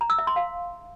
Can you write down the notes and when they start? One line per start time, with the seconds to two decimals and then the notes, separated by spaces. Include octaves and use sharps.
0.01 A#5
0.10 E6
0.18 E5
0.27 C6
0.36 F5